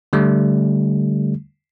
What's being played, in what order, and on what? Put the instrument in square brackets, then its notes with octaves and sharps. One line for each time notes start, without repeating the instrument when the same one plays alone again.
[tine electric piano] D3 G3 A3